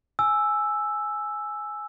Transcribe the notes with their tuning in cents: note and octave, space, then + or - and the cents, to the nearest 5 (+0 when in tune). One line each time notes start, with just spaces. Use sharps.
G#5 +10 E6 +0